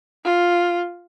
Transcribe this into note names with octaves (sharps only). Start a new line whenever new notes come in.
F4